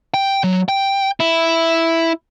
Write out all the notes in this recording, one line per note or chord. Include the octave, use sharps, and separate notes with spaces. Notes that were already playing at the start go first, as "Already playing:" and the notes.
G5
F#3
G5
E4